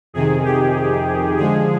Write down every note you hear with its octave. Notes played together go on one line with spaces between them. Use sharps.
F2 C3 D#3 G#4
G4
D3 F3 G#3 G#4